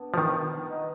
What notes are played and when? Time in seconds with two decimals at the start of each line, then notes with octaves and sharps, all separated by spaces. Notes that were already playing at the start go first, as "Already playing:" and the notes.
Already playing: B2 B3 D4
0.14 F3
0.18 D#3 G3
0.64 B3 D#4